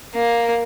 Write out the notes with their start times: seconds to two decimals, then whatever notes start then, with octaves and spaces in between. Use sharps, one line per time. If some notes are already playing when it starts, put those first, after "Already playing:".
0.15 A#3